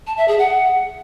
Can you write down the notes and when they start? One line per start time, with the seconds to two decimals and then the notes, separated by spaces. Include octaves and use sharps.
0.07 A5
0.17 E5
0.28 G#4
0.39 F#5